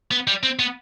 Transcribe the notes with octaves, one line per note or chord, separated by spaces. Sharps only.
B3
G3
C4
B3